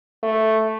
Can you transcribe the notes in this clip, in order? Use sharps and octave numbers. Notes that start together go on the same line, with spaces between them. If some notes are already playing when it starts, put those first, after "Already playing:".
A3